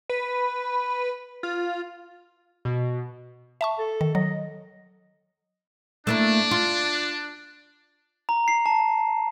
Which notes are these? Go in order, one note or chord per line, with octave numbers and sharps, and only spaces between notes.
B4
F4
B2
E5 A5 C#6
A4
D#3
F#3 D#5
A3 A#3 D4 E4
F4
A#5
C7
A5